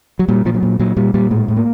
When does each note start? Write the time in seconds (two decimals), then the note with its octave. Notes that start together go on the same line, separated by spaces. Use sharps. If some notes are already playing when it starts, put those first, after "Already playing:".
0.19 F#3
0.28 A#2 G3
0.45 A#2 F3
0.54 F#3
0.63 A#2
0.79 A#2 F#3
0.97 A#2 G3
1.14 A#2 G3
1.31 A2 G#3
1.48 A2
1.57 A#3